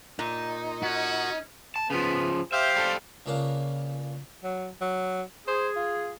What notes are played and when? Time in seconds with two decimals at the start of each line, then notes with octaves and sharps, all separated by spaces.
0.19 A#2 D#4
0.83 C#4 F#4
1.76 A5
1.90 C#3 F3 B3
2.52 G4 C5 E5 F5
2.76 G3 A4
3.26 C#2 C#3 A#3 D4 F5
4.44 F#3
4.81 F#3
5.48 G#4 C5
5.76 F4